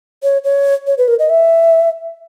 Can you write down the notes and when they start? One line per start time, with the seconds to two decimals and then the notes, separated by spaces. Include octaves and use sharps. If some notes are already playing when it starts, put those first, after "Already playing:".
0.23 C#5
0.44 C#5
0.87 C#5
0.98 B4
1.08 A#4
1.19 D#5
1.29 E5